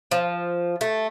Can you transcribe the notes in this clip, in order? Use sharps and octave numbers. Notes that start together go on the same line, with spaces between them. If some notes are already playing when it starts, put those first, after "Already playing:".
F3
A3